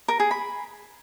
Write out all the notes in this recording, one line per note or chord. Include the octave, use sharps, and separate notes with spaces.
A#4
G#4
B5